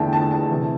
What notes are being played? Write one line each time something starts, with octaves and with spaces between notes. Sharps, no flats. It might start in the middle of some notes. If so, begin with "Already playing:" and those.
Already playing: E2 D3 A3 E4 G5 A5
A5
A5
C3 E3